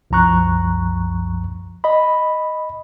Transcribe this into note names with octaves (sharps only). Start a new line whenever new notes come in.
C2 F#2 F3 A#5 C#6 F#6
D#5 B5